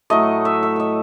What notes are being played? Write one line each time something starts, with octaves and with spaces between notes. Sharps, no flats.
A2 F#3 A3 D#5
E5
E5
D#5 E5